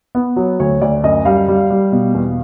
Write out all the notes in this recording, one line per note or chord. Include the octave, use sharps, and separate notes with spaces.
B3
F#3
D2 C#5
D2 D5
F#2 D#5
G3 F5
G3
G3
B2
E2